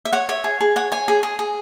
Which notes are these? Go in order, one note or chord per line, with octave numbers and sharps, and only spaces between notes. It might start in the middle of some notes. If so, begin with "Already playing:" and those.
E5
C#5 F#5
C#5 E5
G#4
G#4
C#5 F#5
C#5 G#5
G#4
G#4
G#4